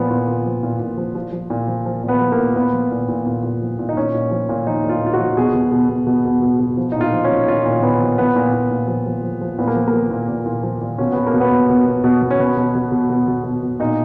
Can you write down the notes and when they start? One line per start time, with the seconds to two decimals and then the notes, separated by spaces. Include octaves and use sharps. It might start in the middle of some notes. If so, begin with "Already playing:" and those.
Already playing: A#2 F3 B3
0.11 A#2
0.28 A#2
0.46 F3
0.63 A#2
0.80 A#2
0.97 F3
1.15 F3
1.32 F3
1.50 A#2
1.68 F3
1.86 F3
2.04 A#2 B3
2.21 F3
2.32 A#3
2.38 A#2
2.56 A#2 B3
2.73 F3
2.92 A#2
3.08 A#2
3.27 A#2
3.43 A#2
3.62 F3
3.79 A#2
3.89 D#4
3.97 A#2 C#4
4.14 A#2
4.31 F3
4.49 A#2
4.67 F3 D#4
4.84 A#2
4.89 F4
5.01 A#2
5.07 F4
5.13 F#4
5.20 F3
5.37 B2 G#4
5.54 B2
5.72 B2
5.89 B2
6.07 B2
6.25 B2
6.42 B2
6.60 B2
6.77 F3
6.92 A#2 D#4
7.01 F4
7.13 F3
7.24 C#4
7.30 F3
7.47 A#2 F4
7.66 A#2
7.83 A#2 B3
8.00 F3
8.18 F3 B3
8.36 A#2
8.53 A#2
8.71 A#2
8.88 F3
9.06 F3
9.23 F3
9.41 F3
9.59 A#2 B3
9.68 A#3
9.76 F3
9.88 A#3
9.93 F3
10.11 A#2
10.29 A#2
10.46 A#2
10.63 F3
10.81 A#2
10.98 B2 C#4
11.12 B2 B3
11.27 A#3
11.34 B2
11.40 B3
11.52 B2
11.70 B2
11.86 B2
12.04 B2
12.22 B2
12.31 C#4
12.40 B2 B3
12.57 B2
12.75 B2
12.92 B2
13.10 B2
13.28 B2
13.44 B2
13.62 B2
13.80 A#2 D#4